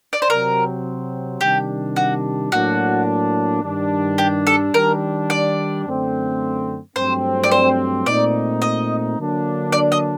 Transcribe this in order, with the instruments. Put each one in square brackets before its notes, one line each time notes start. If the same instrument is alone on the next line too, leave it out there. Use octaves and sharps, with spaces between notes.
[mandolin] D5
C5
[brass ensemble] C3 F#3 C4 [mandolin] A#4
[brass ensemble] C3 D#3 G3 D4 [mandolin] G4
[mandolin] F#4
[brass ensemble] A2 F#3 A#3 D4 [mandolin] F#4
[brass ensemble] G2 D#3 G3 D4
[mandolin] G4
A4
[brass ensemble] D#3 G3 D4 [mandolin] A#4
[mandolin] D5
[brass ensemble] F#2 D3 A3 C4
[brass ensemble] G2 F#3 A3 C4 [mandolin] C5
[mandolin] D5
C5
[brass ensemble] A#2 A3 C4 D#4 [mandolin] D5
[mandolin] D#5
[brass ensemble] D3 F#3 A#3 D4
[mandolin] D5
D#5